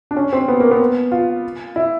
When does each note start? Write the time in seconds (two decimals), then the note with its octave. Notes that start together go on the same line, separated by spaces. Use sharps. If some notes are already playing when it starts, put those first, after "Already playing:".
0.11 D4
0.17 C#4
0.33 C4
0.48 B3
0.60 A#3
0.71 B3
1.12 F4
1.76 E4